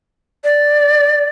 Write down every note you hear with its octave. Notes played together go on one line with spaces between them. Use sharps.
D5